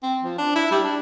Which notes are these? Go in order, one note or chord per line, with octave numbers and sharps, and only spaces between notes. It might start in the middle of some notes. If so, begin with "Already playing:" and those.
C4
F3
D4
E4
G3
D4